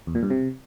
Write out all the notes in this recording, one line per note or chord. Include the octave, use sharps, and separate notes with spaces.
E2
A#2
G2
C3